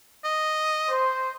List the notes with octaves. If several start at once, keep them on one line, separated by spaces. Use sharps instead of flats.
D#5
C5